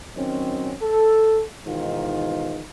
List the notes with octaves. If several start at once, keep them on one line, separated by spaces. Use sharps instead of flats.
D#3 F#3 C4 C#4
A4
G#2 B2 D#3 E3 F4